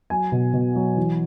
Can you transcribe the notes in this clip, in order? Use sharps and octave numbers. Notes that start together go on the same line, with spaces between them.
F#3 G#5
B2
B2
F#3
E3